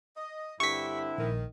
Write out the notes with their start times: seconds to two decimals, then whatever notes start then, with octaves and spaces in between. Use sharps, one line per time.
0.16 D#5
0.60 G2 D3 C4 E4 G4 C#6 B6
1.18 A#1 D#3